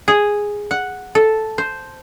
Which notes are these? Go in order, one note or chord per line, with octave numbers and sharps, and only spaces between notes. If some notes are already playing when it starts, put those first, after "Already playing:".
G#4
F#5
A4
C5